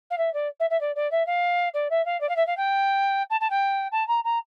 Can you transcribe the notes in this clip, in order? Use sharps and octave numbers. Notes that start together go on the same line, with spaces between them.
F5
E5
D5
E5
E5
D5
D5
E5
F5
D5
E5
F5
D5
F5
E5
F5
G5
A5
A5
G5
A5
A#5
A#5